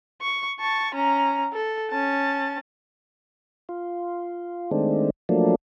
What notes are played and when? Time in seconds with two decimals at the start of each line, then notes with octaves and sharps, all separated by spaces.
0.21 C#6
0.60 A5 C#6
0.94 C#4 A#5
1.53 A4
1.91 C#4 A5
3.69 F4
4.71 D#3 G#3 A3 C4 D4
5.29 F3 F#3 A3 A#3 D4